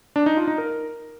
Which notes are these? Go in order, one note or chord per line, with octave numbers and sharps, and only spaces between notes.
D4
D#4
F4
D#4
A#4